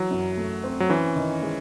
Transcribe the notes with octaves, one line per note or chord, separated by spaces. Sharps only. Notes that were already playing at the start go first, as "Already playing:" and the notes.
Already playing: E3 F#3
F#2
A3
C4
F#3
E3 C#4
D#3
G#3